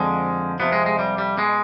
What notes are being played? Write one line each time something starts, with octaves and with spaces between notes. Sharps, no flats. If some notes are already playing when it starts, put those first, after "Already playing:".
Already playing: F2 D3 F3 G#3
F2 C3 F3 B3
G#3
G#3
G3
G3
B2 G#3